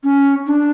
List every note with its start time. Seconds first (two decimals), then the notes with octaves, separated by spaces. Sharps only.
0.04 C#4
0.47 D4